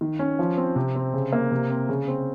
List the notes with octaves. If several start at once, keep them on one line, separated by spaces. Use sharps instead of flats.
D#3
C#4
F3
C4
C3
C4
C#3
A#3
C3
C4
C#3
C4